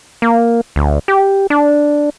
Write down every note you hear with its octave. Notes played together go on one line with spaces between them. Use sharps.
A#3
D2
G4
D4